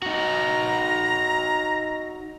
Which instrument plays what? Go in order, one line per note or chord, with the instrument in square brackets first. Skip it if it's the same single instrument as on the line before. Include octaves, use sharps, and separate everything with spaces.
[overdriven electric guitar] D#4 F#4 [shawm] A#5